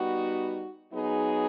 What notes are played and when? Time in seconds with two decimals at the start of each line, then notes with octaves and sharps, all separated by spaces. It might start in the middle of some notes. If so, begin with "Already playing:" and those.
Already playing: G3 B3 D#4 F#4
0.93 F#3 B3 D#4 G#4